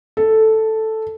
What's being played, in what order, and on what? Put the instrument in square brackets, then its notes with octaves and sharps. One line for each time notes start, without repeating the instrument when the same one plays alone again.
[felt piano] A4